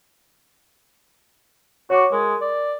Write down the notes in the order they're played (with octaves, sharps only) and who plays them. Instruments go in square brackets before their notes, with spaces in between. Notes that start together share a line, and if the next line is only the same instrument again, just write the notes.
[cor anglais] F#4 [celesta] C#5 C#6 D6
[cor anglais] G#3 [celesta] A#4
[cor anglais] D5